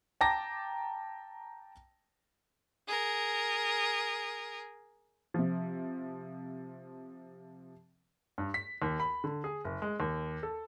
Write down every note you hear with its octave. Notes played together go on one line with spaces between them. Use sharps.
G5 A5 A#5 D6 A#6
G#4 A#4
C3 F3
G2
B6
D#2
B5
D3
G#4
F#1
G#3
D#2
A4